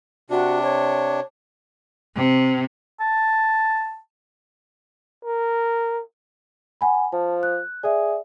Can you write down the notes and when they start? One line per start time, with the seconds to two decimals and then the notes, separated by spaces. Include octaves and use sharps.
0.30 C3 D4 F#4
0.63 C#5
2.16 C3
3.00 A5
5.25 A#4
6.81 F#5 G#5 B5
7.12 F3 A5
7.43 F#6
7.83 G#4 D5 E5